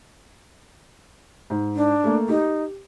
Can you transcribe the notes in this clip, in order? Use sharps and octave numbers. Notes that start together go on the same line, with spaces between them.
G#2
D4
A3 A#3
D#4 G4